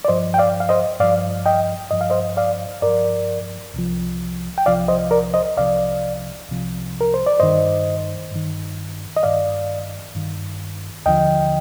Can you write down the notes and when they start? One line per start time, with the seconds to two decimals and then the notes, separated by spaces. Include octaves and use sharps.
0.05 D5
0.08 G2 F3 C5 D#5
0.34 G5
0.38 D5 F5
0.60 F5
0.69 C5 D#5
1.00 G2 F3 D5 F5
1.46 D#5 G5
1.91 G2 F3 D#5
2.01 F5
2.10 C5 D#5
2.37 D5 F5
2.82 G2 F3 A#4 D5
3.74 C2 C3 F3
4.58 G5
4.66 C2 C3 F3 D5 F5
4.88 C5 D#5
5.11 A#4 D5
5.34 C5 D#5
5.57 C2 C3 F3 D5 F5
6.49 C2 C3 F3
7.01 A#4
7.14 C5
7.27 D5
7.40 G2 D#3 C5 D#5
8.31 G2 D#3
9.16 D#5
9.23 G2 D#3 D5 F5
10.14 G2 D#3
11.06 D#2 D3 F3 D#5 G5